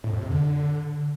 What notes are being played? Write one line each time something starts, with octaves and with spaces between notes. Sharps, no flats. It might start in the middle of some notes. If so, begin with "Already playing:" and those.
A2
F2
C3
D3